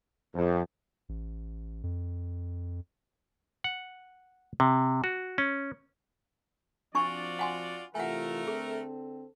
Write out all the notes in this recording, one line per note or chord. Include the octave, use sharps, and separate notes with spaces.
F2
A1
F2
F#5
C3
F#4
C#4
F3 C4 D4 F4 F#4 D5 G#5 C#6
F#5 G#5 C6
C3 E3 A3 F4 A#4 F#5 G#5
D3 C4 G#4 A4